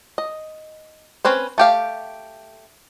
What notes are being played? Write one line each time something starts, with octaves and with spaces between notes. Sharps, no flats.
D#5
C4 C#4 B4 C5
A3 G4 F5